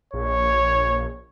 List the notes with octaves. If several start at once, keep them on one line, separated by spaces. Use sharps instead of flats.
A#1 C#5